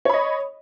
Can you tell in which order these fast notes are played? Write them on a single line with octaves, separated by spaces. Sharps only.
C#5 B5 D#5